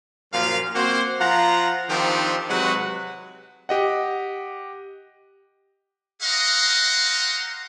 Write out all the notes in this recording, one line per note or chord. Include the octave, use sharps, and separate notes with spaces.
F#2 A#2 F3 F5
A#3 C4 F#4 C5
F3 F4 F#5 A#5
D#3 F3 C4 D4 D#4 G4
C3 F#3 G#3 F#4 B4 F#5
G4 D#5 F#5
G4 D#5 F5 F#5 A#5 C6